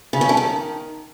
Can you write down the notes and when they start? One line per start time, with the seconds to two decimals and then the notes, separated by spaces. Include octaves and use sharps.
0.13 C#3
0.21 C#4
0.29 A3
0.37 D#3